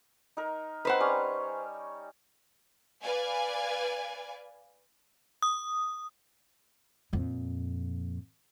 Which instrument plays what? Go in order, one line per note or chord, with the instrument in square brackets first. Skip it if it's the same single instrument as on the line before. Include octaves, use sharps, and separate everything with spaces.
[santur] D#4 A#4
[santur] C4 D#4 [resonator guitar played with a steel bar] B4 C5 F#5
[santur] G3 C#4 C#6
[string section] B4 D5 F5 G#5
[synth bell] D#6
[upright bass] F2 A#2